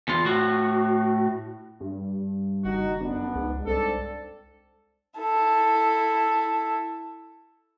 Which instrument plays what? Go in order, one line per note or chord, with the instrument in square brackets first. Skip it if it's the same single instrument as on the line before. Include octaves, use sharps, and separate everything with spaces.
[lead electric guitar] E2 F4
A2 F#4
[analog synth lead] G2
[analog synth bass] F#1 [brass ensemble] D#3 D#4 F#4
[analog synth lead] F#2 [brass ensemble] B3 D4
[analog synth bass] C#2 [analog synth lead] G#2
[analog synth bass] C2 [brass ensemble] C4 D4 A4
[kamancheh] E4 A4